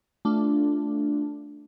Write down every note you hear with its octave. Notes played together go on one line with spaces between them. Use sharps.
A3 D4 F4